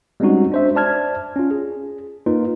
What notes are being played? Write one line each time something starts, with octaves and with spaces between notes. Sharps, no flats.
G3 G#3 C4 C#4 D#4 F#4
D4 C5 E5
C5 D5 A5 F6 G#6
C#4 F4
G#4
A#3 D#4 F4 B4